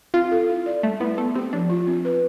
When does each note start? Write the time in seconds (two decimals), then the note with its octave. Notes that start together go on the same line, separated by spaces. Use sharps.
0.14 C4 F4
0.31 A4
0.49 E4
0.66 D5
0.83 G3 A3
1.00 B3 E4
1.17 A3 B3
1.35 C4 G4
1.53 F3 D4
1.70 F4
1.87 C4
2.05 B4